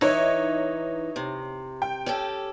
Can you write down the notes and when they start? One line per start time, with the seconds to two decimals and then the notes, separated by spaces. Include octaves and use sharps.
0.01 E3 D#4 C#5
1.16 C3
1.82 G5
2.06 C#4 G4 A4